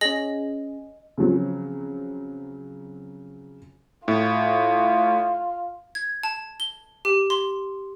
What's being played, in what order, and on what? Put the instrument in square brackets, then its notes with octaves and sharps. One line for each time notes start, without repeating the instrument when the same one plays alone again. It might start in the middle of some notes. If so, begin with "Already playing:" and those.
[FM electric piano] C#4 G#4 [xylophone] D#5 A#6 F#7
[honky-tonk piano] C#3 F3 F#3 C4
[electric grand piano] A2 [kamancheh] F4
[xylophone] G#6
A5
G7
G4
C6